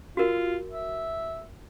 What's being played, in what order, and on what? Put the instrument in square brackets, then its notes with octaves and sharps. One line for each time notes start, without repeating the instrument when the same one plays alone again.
[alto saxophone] F4 [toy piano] F#4 A#4
[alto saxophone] E5